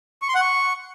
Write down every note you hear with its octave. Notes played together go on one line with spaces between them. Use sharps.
C#6
C6
F#5
C#6